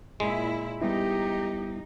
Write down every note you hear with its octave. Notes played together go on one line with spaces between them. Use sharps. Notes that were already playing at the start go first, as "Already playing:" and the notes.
A#2 G#3 E4
G3 B3 D#4 E4 G4